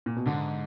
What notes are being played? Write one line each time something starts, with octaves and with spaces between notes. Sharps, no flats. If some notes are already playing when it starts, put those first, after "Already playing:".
A#2
B2
G#2 D3